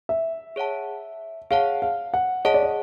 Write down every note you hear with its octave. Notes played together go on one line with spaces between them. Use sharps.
E5
G#4 C#5 F#5 A5
G#4 C#5 F5 F#5 A5
F5
F#5
G#4 C#5 D#5 F#5 A5
D5
D#5